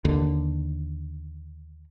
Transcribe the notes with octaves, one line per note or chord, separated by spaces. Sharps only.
D#2 D3